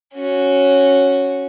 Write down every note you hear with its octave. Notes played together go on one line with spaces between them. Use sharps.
C#4 F#4